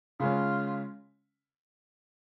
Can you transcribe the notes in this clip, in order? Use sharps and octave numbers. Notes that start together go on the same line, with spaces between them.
C#3 G#3 C#4 F4